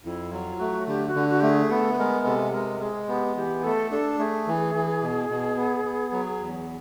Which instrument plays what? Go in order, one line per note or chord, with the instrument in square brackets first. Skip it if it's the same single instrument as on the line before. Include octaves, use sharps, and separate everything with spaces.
[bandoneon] F2 [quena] E4
[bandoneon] F#3 [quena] F4
[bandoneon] A3 [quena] F#4
[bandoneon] D3 [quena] G4
[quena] F#4
[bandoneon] D3
[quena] F#4
[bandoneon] A3 [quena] G4
[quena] G#4
[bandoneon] B3 [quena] A4
[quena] B4
[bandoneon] G#3 [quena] A#4
[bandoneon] C3 [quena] A4
[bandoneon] G#3 [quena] A#4
[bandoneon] G#3 [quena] G#4
[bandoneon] B3 [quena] G4
[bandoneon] E3 [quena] G4
[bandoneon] A3 [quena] A4
[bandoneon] D4 [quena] A4
[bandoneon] A3 [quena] G#4
[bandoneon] E3
E3
B2
B2
B3
B3
F#3
E2